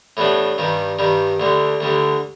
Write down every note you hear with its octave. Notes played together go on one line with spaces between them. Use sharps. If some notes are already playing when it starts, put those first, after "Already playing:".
A2 E3 G3 B3 D4
G2 D#3 G3
G2 D#3 G3
D2 D3 G3
D2 D3 G3